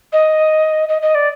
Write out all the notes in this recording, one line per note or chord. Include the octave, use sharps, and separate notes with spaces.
D#5
D#5
D#5
D5